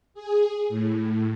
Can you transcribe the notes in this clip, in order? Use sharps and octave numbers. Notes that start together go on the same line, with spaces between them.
G#4
A2